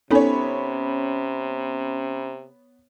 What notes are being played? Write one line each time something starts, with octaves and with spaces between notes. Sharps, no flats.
C3 B3 C#4 D#4 A4 C#5 G#5 B5